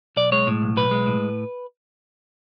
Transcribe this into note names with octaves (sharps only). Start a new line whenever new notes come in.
B1 D5
G#3 C#5
A2
B1
B1 B4
G#3
A2